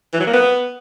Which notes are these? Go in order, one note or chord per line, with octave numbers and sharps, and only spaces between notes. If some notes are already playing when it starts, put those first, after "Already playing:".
E3
F#3
A#3
B3